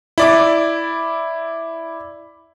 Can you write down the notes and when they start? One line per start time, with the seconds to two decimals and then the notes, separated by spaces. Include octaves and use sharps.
0.18 E4 D5 D6